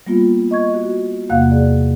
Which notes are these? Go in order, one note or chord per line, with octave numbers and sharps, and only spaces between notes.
G3 A#3 B3 F4
D#5 C#6 G#6
F#4
E2 C3 A#3 F5 F#5 F#6
G#4 D5